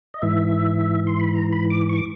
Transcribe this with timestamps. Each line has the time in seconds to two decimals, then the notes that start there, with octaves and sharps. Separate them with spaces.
0.14 D#5
0.22 G#2 E3 E5
1.07 C6
1.20 B5
1.33 A#5
1.52 B5
1.70 D6
1.89 C#6
1.97 D6